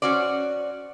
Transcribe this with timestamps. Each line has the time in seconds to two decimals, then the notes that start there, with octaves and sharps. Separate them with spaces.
0.02 C#4 F#4 C5 D5